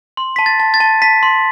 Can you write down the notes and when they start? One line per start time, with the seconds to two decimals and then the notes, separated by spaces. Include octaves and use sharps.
0.17 C6
0.36 A5 B6
0.46 A6
0.60 A5
0.74 A6
0.80 A5
1.02 A5 B6
1.23 C6